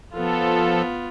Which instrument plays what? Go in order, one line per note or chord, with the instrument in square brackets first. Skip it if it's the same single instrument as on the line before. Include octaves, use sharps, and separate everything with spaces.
[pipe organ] F3 A4 [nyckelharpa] B3 F4